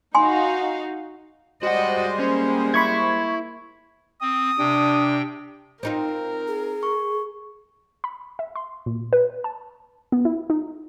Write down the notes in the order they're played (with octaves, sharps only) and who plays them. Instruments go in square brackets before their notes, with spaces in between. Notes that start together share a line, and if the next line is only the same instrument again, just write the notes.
[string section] D#4 F#4 F5 [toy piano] G#5 C6
[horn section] G3 G#3 C5 [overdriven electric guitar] F#4 F#5 [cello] D5 D#5
[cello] A#3 [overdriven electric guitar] C#4
[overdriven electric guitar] E4 [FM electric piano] B5 C#6 G#6
[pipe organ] C4 [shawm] D#6
[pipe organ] C3 G5 [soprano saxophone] D4
[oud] C4 D#4 F4 [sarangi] A#4
[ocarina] G#4
[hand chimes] C#6
[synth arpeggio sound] B5
E5
C6
A#2
B4
A5
B3
E4
D#4